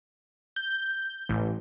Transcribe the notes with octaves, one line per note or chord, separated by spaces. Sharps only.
G6
A1